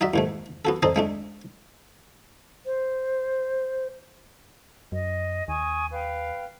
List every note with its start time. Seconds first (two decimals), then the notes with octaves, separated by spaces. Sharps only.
0.01 D#4 F#4 D5 E5
0.14 D#2 G#2 A3
0.65 B3 F#4 A4
0.83 C4 D#4 A4 C5 D5 D#5
0.96 G#3 A3 D4
2.66 C5
4.92 F#2 D#5
5.48 D#2 G#5 C#6 D#6
5.91 B4 F5 G5